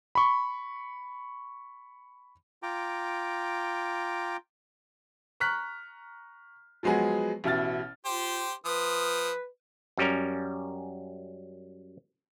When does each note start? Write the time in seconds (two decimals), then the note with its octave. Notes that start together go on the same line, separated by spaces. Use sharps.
0.15 B5 C#6
2.63 F4 G5 A#5 D6
5.40 A#5 C#6 F6 F#6 B6
6.83 F3 F#3 G#3 B3 G#4
7.44 A1 B2 E4 F6 A6
8.05 F4 G4 C5
8.65 F3 B4 D#6
9.97 F#2 G3 C#4 A#4